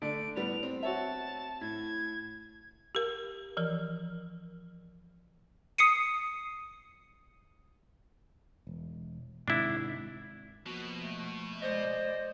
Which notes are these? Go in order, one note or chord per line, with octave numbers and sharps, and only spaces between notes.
D3 A3 D4 D7
A2 G3 B3 F7
C4
F#4 C#5 E5 A5
A2 G#6
G4 A#4
E3 F3 A#4
D#6 C7 C#7 D#7
E1
G#2 C3 D#3 D4 E4
B2 F3 A#3 F#4
A3
G#3 C5 D5 D#5